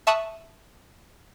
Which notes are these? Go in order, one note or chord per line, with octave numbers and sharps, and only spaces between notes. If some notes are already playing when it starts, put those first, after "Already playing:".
E5 A5 C#6 D#6 E6 F#6